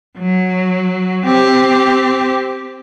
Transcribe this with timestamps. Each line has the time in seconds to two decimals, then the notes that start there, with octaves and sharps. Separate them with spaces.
0.18 F#3
1.25 C4 G4